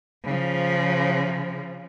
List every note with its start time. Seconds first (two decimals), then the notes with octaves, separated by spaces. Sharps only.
0.24 C#3 F3